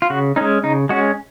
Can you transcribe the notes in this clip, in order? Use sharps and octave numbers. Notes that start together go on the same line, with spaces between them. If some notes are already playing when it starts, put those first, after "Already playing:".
F4
C#3 F#4
G#3 C#4 D#4
C#3 D#4
G#3 C#4 F#4